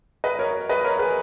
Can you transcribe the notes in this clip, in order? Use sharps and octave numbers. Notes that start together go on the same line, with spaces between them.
B4 D#5
A#4 C#5
B4 D#5
A#4 C#5
G#4 B4